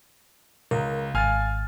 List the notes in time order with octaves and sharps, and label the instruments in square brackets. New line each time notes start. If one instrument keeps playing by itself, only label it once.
[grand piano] C#2 [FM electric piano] A#4
[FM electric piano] G#1 A6 [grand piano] F5 G#5 F6